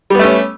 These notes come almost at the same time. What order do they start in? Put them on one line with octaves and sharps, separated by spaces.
G3 B3 A3 C#4